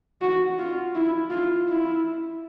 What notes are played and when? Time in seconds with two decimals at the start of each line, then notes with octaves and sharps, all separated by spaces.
0.21 F#4
0.59 F4
0.95 E4
1.30 F4
1.68 E4